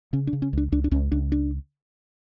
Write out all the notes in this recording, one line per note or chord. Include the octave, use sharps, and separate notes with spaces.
C#3 C#4
D4
C#3
C#4
C#2 D4
C#2 D4
D4
C#2 C#4
C#2 D4
D4